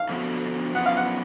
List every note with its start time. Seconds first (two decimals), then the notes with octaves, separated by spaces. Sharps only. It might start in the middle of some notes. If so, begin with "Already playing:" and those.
Already playing: F5
0.09 D3 F3 B3 F#4
0.75 F#2 F3 B3 F#5
0.86 F5
0.97 F#5